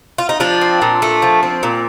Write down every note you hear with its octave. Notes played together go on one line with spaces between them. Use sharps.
F4
D#4
F3 D4
C4
A#2
A3
F3
C4
A#2